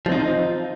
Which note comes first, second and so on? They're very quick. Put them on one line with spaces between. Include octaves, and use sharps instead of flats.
F3 C4 D#4 F4